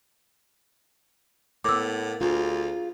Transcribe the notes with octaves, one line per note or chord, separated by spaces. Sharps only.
A2 A#3 B3 D6 E6
D2 F4 G#4